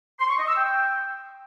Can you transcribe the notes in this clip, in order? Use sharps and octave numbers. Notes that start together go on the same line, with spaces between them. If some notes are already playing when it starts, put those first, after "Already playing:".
C6
C#6
D#5
E6
G5